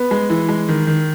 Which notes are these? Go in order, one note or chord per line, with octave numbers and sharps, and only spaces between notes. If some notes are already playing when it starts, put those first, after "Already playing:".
Already playing: B3
G#3
E3
G#3
D#3
D#3